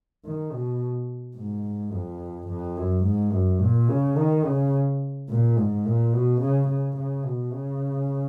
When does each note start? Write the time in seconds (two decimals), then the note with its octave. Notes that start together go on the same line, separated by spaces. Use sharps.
0.25 D#3
0.53 B2
1.37 G#2
1.93 F2
2.49 F2
2.77 F#2
3.05 G#2
3.32 F#2
3.61 A#2
3.89 C#3
4.17 D#3
4.45 C#3
5.29 A#2
5.57 G#2
5.85 A#2
6.13 B2
6.41 C#3
6.69 C#3
6.97 C#3
7.25 B2
7.53 C#3